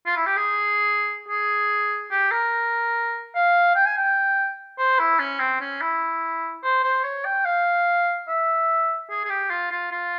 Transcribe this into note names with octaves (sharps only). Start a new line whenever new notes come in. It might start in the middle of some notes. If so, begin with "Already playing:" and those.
F4
E4
G4
G#4
G#4
G4
A#4
F5
G5
G#5
G5
C5
E4
C#4
C4
C#4
E4
C5
C5
C#5
G5
F5
E5
G#4
G#4
G4
F4
F4
F4